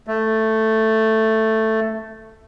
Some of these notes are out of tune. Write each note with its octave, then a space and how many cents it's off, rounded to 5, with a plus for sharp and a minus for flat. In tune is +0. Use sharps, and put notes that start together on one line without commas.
A3 +5